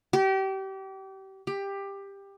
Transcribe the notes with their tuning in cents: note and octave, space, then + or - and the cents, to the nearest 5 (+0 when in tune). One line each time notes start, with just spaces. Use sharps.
G4 -30
G4 +15